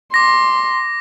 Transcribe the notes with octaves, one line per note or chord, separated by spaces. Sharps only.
C6 D6 A#6